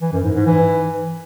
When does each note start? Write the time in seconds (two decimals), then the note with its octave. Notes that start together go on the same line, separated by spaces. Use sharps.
0.01 E3
0.13 F#2
0.24 G#2
0.35 G#2
0.46 E3